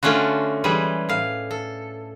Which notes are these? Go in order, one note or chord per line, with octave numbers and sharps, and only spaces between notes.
D3 A3 C#4 D4 F4 F#4
E3 G3 G#3 G#4 B4
A2 F5
A4